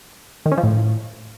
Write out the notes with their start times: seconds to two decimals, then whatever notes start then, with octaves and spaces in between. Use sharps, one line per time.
0.46 D#3
0.52 C#4
0.58 F3
0.63 A2